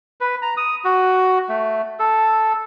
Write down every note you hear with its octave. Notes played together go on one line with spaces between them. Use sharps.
B4
A#5
D#6
F#4
A3
A4